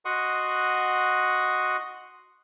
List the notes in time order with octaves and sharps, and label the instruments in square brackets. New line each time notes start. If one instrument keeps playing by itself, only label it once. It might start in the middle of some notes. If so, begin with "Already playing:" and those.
[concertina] F#4 D#5 F#5 C6 C#6 D#6